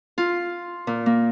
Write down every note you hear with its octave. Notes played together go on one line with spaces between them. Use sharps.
F4
A#2
A#3